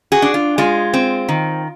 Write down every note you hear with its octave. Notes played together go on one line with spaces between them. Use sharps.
F#4 G#4
D4
F4
G#3 F4
C4
D#3